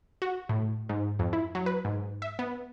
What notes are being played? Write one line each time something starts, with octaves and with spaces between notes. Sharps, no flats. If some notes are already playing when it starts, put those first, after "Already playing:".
F#4
A2
G#2
F2
E4
F#3
B4
G#2
E5
B3